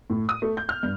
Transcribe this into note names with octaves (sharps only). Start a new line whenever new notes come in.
A2
D#6
A3
G6
F6
G2